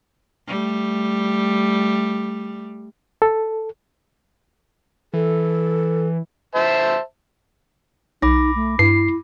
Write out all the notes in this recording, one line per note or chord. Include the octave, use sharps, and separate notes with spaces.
G3 A3
A4
E3 A4
C5 E5 A5
B1 D#4 B5 D6 A#6
A3
G2 E4 C7